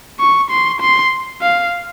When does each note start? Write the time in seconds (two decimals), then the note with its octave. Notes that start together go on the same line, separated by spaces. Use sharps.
0.20 C#6
0.51 C6
0.81 C6
1.42 F5